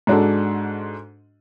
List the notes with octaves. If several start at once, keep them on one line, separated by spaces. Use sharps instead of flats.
G#2 G#3 D4 F#4 A4